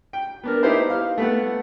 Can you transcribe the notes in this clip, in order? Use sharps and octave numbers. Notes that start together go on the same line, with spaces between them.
G5
B3 D4 A#4
D#4 E4 G4 B4 C5
F5
A3 B3 F#5